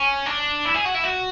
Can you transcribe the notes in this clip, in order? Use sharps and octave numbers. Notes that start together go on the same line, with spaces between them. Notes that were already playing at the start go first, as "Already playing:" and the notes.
Already playing: C#4
D4
E4
G#4
F#4
E4
F#4